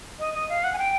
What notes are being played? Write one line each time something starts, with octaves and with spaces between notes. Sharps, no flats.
D#5
D#5
F5
F#5
G#5
G5